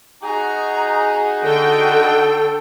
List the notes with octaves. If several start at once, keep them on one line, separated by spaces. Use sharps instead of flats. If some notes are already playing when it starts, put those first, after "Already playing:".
D#4 F#4 G#4 A#5
D3 A4 G5